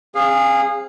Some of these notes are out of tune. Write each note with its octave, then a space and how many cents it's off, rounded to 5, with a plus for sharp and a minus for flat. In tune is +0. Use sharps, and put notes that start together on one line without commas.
C4 +30 G#4 -20 F5 +0